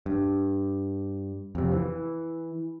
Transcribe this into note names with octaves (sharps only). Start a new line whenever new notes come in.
G2
F2 C3
E3